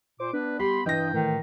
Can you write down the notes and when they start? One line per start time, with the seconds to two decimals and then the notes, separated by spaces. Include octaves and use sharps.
0.20 A#2 C5 D6
0.33 B3 D4 B4
0.60 G3 G4 B5 C6
0.86 G2 E3 D#5 G5 A#6
1.13 A2 D#3